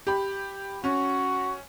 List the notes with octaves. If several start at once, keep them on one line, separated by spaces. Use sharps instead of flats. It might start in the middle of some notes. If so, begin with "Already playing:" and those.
G4 B5
C#4 F#4